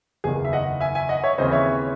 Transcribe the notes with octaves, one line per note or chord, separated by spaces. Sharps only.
F#1 E2 D#3 G#4
E5
D#5 F#5
E5 G#5
E5 G#5
D#5 F#5
C#5 E5
D#2 C#3 E3 C4 C5 D#5
C#5 E5